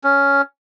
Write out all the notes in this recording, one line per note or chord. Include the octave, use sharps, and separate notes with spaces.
C#4